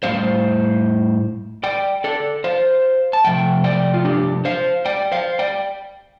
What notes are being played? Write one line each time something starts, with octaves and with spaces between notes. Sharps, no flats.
A2 G3 C4 C5 F5
D5 G5
A4 D5
C5 F5
A5
C3 F3 A3 G5
D5 G5
F4
D4 G4
C5 F5
D5 G5
C5 F5
D5 G5